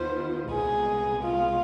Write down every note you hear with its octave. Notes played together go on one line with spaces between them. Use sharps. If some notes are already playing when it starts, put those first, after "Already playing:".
Already playing: D#2 D#3 B3 F4 B4 C5
C2 B2 G#3 B3 G#4
F4